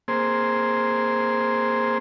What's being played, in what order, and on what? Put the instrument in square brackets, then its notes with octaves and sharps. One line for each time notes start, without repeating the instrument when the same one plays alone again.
[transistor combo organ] A#3 C4 G#4 C5